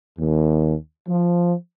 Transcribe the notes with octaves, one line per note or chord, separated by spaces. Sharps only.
D#2
F3